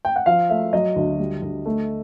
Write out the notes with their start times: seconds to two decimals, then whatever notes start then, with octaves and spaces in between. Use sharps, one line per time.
0.05 G5
0.16 F#5
0.26 F3 F5
0.50 A3 E5
0.73 F#3 D#5
0.96 D2
1.19 G3
1.42 D2
1.66 A3